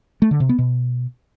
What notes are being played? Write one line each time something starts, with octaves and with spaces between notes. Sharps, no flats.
A3
D3
C3
B3
B2